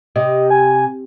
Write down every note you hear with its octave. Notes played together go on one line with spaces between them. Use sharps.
C3 D#5
G#5